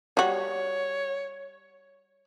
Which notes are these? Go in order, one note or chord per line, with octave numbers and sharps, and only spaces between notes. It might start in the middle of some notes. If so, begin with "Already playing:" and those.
G3 F#4 C#5